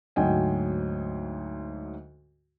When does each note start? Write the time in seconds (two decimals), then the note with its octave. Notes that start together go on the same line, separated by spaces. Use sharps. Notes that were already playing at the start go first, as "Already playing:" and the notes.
0.16 D2 G#2 F#3 D#5 G5 G#5